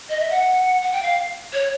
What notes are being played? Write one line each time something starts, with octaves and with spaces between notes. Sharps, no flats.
D#5
E5
F#5
F#5
G5
F5
C#5